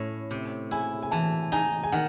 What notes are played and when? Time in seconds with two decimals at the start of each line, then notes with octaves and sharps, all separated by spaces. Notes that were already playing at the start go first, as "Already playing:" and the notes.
Already playing: A2 C#4
0.31 C3
0.71 E4 G#5
1.02 G#5
1.11 E3 A5
1.52 D#4 G#5
1.83 G#5
1.92 D#3 F#5